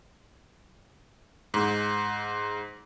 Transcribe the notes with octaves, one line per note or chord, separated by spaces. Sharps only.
G#2